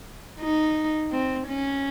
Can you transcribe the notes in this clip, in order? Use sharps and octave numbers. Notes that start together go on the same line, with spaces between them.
D#4
C4
C#4